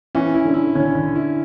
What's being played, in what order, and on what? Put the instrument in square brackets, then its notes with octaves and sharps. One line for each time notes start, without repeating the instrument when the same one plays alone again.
[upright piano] E3 [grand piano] C#4
[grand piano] E4
[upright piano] D3
[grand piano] E4
[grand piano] D3 [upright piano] C#4
[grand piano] D3
E4